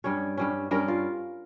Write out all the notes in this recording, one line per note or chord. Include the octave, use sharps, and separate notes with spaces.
G2 G3 C#4 C#5
G2 G3 C#4
G2 G3 C#4 A#4
F4